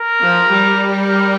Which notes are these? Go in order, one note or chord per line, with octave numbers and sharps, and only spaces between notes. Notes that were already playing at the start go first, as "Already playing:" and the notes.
Already playing: A#4
F3
G3
A#4